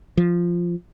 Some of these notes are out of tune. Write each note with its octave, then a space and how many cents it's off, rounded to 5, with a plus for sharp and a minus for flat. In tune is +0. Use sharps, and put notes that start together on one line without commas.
F3 -5